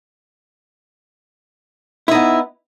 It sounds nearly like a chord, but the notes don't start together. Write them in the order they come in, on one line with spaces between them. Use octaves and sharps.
E4 D#4 B3